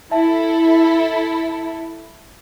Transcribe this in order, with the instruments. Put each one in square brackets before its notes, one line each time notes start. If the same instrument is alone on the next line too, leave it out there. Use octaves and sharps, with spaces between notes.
[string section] E4 A4 [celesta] E5 A5